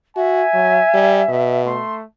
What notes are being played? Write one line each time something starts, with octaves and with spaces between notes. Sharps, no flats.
F#4 E5 G#5
F#3
G3
B2
A3 C6